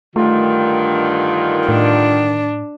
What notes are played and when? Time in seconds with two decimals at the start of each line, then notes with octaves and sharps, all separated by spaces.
0.16 G2 D3 D#3 A3 F4
1.69 A2 D4